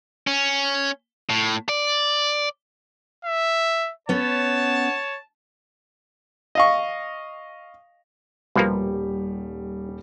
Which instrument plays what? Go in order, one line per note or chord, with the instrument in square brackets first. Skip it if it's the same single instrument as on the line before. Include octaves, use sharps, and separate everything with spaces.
[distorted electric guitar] C#4
A2
D5
[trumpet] E5
[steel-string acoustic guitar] B3 C#4 [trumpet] C#5 [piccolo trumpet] A5
[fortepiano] D#5 F5 C#6
[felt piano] D#1 G3 [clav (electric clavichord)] B2 F3 A#3